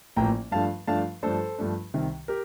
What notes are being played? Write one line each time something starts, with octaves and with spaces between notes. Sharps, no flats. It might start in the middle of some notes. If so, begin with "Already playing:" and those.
A1 A2 F3 A#3 G5 A#5
G2 F3 A3 D4 F5 A5
G2 F3 A3 D4 F5 A5
G2 F3 A3 D4 A4 C5
G2 F3 A3 D4
C2 C3 D#3
G4 A#4